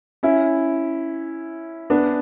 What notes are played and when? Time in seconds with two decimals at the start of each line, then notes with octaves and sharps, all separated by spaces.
0.23 C#4 E4
1.90 B3 D4